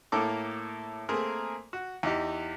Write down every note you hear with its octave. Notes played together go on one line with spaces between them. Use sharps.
A2 A#3 A4 D6
A3 A#3 C4 G#4 A#4
F#4
E2 D#4 G4